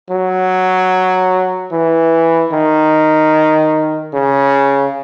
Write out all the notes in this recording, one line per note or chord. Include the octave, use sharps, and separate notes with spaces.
F#3
E3
D#3
C#3